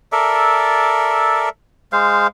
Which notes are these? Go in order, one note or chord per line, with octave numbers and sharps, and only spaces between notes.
A4 A#4 D5 E5
G#3 C5 F5